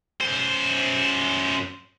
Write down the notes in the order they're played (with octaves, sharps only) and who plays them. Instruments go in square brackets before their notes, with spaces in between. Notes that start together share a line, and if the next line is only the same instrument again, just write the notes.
[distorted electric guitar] F#2 C5